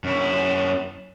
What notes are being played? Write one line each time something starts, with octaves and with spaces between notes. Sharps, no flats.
F#2 E4